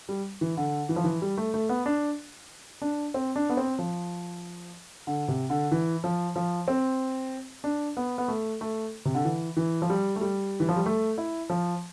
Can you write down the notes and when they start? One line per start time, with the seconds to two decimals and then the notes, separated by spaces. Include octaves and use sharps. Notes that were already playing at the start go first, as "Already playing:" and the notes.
0.09 G3
0.41 E3
0.57 D3
0.89 E3
0.96 F3
1.04 E3
1.22 G3
1.37 A3
1.54 A3
1.69 B3
1.86 D4
2.82 D4
3.14 C4
3.36 D4
3.50 B3
3.57 C4
3.79 F3
5.07 D3
5.28 C3
5.50 D3
5.72 E3
6.04 F3
6.36 F3
6.68 C4
7.64 D4
7.97 B3
8.18 B3
8.28 A3
8.61 A3
9.05 C3
9.15 D3
9.25 E3
9.57 E3
9.82 F3
9.90 G3
10.16 A3
10.21 G3
10.60 E3
10.69 F3
10.76 G3
10.86 A3
11.18 E4
11.50 F3